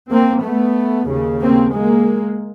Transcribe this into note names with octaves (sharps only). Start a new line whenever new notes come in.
A#3 C4
A3 B3
D#2 C#3
A#3 C4
G#3 A#3